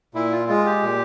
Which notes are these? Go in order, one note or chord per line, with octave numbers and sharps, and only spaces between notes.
A#2 E4
F4
G#3 F4
G4
A#2